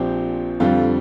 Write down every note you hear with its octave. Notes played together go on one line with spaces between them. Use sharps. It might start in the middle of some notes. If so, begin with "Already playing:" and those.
Already playing: A#1 A#2 F3 C4 G4
F2 D3 G3 C4 F4